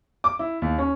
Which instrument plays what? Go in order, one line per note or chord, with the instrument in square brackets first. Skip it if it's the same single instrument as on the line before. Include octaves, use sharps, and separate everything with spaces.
[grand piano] D6
E4
D#2
C#4